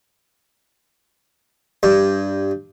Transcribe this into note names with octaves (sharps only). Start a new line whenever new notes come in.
G2